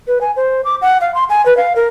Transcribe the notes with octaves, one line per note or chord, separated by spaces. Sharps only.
B4
G#5
C5
D6
F#5
F5
C6
G#5
B4
F5
A#4